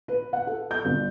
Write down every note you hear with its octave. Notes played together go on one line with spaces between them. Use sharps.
B4
F#5
A4
G6
G1